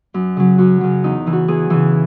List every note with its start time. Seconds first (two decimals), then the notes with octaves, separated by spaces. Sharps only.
0.14 F#2
0.37 C#3 F#3
0.58 F#2 F#4
0.81 C#3 F#3
1.04 E2 D#4
1.26 C#3 E3
1.33 F#4
1.48 E2 G#4
1.70 C#3 E3